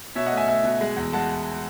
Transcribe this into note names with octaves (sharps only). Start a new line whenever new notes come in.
B2 C#5 E5
D#5 F#5
A3
E5 G#5
A3 E5 G#5
B2
G#3
E2
G#3 F#5 A5